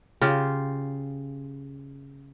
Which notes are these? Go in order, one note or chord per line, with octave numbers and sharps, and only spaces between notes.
C#3 F4 G4